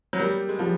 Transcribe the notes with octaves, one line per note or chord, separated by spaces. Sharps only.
F#3
G3 A#3
G#3
F3 G3